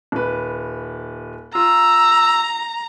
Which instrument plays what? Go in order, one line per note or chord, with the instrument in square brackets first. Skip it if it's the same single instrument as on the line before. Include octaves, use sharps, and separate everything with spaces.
[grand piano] D#1 B4
[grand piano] F4 [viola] A#5 [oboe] E6